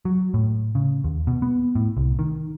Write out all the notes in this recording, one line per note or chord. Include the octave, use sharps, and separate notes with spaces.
F#3
A2
C#3
D#2
B2
B3
A2
C2
D#3